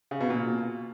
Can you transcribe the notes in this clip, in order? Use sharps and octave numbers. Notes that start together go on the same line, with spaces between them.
C#3
B2
A#2